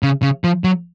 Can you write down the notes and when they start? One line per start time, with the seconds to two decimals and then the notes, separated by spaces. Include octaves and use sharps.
0.03 C#3
0.22 C#3
0.44 F3
0.64 F#3